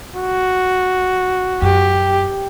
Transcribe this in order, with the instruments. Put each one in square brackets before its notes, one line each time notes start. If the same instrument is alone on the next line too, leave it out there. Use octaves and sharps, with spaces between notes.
[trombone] F#4
[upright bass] F#2 [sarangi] G4